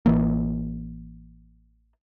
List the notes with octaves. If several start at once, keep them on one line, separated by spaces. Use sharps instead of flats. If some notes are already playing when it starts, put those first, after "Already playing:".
A1 E3 A#3